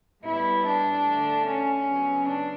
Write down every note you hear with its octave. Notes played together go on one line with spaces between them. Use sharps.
A2 G3 B3 E4
D4
D3 A3
C#4
C#3 F#3 B3
D4